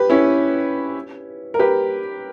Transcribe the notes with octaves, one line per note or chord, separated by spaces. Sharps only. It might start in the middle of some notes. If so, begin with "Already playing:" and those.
Already playing: G4 B4
C#4 E4
A#4
G4 B4